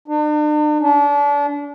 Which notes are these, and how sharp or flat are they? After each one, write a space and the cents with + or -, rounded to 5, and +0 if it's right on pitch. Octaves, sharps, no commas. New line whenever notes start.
D4 +45
D4 -30